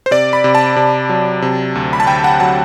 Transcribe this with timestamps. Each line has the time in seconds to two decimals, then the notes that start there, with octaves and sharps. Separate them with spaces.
0.06 C5
0.11 C3 D5
0.33 B5
0.44 C3
0.55 A5
0.76 C3
1.09 F#3
1.42 C3
1.75 D2
1.93 B5
2.00 A5
2.07 D2 G5
2.24 F#5
2.40 F#3 A5